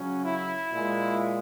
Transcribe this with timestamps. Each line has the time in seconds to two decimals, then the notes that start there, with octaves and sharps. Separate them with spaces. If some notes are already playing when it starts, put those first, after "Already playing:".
Already playing: C#3 F#3 C#4
0.23 E4
0.72 A#2 G#3